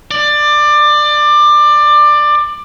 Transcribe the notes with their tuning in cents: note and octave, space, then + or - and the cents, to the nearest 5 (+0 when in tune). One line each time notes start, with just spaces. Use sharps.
D5 +20